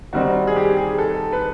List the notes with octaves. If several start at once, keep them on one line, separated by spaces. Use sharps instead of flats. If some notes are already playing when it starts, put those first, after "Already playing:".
D#3 G3 C4 D#4 F#4
G#4
G4
G#4
A4
B4